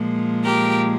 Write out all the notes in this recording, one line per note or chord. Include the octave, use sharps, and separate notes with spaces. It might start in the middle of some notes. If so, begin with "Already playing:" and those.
Already playing: A#2 F3 G#3
G4 A#4